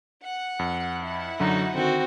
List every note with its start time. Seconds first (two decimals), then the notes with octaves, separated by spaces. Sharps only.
0.24 F#5
0.59 F2
1.03 E4 F#5
1.40 F#2 D3 F#3 D#4 F#4
1.75 D3 D#3 C4 F#4